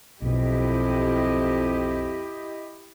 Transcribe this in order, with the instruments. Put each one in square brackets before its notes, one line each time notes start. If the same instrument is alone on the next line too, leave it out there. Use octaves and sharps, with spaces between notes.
[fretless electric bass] B1 B2 [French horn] F2 [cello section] E4 G4 D#5